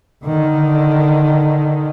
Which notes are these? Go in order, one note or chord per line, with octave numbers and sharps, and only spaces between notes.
D3 D#3